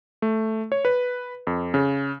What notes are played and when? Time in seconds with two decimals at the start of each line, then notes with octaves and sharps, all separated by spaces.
0.22 A3
0.72 C#5
0.85 B4
1.47 F2
1.74 C#3